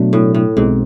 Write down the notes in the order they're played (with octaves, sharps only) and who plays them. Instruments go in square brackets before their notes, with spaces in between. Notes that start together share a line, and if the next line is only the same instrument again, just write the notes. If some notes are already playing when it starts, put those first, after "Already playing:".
Already playing: [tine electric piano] B2 F#3 A3 D4
[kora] A2
A2
[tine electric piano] B1 B2 G#3 C4 [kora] G#2